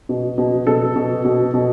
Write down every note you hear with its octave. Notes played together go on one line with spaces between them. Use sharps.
B2
B2
B2 A4
B2
B2
B2